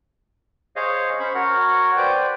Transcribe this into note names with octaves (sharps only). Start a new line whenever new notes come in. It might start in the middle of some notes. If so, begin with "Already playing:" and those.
G#4 C5 C#5 D#5 F5
C#4 C5 B5 C#6
F#4 A#4 C#5 F#5
B4 C5 D5 G5